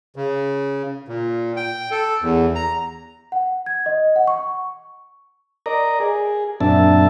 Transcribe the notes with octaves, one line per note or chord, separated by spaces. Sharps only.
C#3
A#2
G5
A4
E2
A#5
F#5
G#6
D#5
F#5
C#6
A#4 D5 D#5 A#5
G#4
F#2 A#2 C4 D4 E5 A5